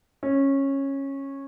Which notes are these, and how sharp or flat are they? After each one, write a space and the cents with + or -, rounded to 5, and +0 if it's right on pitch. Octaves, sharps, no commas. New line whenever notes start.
C#4 -15